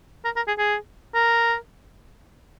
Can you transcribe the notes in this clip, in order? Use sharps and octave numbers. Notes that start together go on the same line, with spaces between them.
A#4
A#4
G#4
G#4
A#4